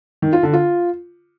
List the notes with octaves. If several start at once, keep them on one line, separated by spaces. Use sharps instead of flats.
D#3
F4
D3
F4